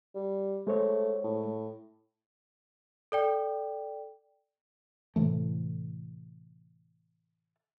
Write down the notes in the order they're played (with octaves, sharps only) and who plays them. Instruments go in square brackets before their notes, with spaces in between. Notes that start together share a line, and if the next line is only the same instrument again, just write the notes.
[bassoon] G3
[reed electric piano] G#3 C5 C#5 [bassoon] A3
[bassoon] A2
[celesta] A4 D5 G5
[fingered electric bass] A2 C3 E3 A3